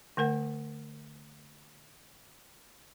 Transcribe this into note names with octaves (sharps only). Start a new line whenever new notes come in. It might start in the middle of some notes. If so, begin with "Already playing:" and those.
D3 A3 A#4 F#5